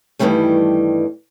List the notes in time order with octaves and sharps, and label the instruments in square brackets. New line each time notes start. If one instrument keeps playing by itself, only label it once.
[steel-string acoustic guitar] G2 B2 D#3 E3 G3 A3